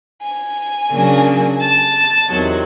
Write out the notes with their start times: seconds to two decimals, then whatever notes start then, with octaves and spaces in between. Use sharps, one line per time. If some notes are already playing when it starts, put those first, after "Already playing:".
0.21 G#5
0.91 C#3 F#3 A#3 D4
1.61 A5
2.30 E2 C3 D#3 F#3